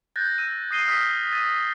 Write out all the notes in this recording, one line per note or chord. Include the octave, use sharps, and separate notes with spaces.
F#6 G6 A6 A#6
E6 D#7
D#6 A#6 C7 D#7 G7
D#6 F6 B6
E6 A6 D#7